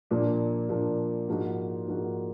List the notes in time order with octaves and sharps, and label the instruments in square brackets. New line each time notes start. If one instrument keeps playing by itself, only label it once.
[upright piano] A#2 F3 A#3 D4 F4
A#2 F3 A#3 D4 F4
G#2 F3 A#3 D#4 F#4
G#2 F3 A#3 D#4 F#4